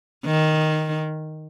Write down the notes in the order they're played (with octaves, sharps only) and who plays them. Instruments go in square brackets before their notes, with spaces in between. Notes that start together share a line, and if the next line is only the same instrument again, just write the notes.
[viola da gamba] D#3